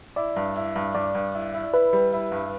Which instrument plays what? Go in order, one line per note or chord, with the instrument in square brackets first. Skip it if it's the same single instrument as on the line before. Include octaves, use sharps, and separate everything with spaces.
[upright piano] E4 [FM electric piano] D5
[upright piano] G2
E4
G2
[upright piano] G2 [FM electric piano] D5
[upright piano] G2
E4
E4
[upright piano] E4 [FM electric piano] B4
[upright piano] G3
E4
G2